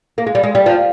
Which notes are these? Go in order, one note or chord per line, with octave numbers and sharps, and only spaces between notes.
A#3
G#3
G3
G#3
G3
F3